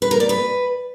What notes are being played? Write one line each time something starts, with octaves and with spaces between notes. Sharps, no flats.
B4
A#4
D5
B4